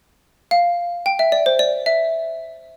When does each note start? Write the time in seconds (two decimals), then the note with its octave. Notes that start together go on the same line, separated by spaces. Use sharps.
0.51 F5
1.06 G5
1.19 E5
1.32 D5
1.46 C5
1.59 D5
1.86 E5